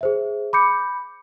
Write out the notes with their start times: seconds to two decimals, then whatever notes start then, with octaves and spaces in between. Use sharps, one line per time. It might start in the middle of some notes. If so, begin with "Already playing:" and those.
0.01 G#4 C5 E5
0.53 B5 D6 G6 C#7